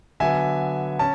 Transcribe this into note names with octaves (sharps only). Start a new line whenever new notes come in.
D3 F#3 B3 E5 G#5
C#4 A5